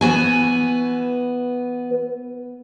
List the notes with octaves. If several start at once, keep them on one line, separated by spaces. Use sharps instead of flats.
E3 B3 F#4 G#5